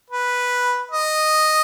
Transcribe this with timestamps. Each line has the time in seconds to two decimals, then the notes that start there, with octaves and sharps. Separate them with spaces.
0.10 B4
0.91 D#5